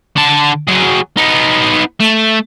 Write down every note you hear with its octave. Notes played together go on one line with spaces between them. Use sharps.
D3 A5
F#3 G#4
B3 D#4
A3